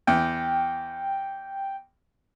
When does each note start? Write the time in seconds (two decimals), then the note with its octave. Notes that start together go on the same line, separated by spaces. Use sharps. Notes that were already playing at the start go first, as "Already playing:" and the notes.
0.07 E2 G5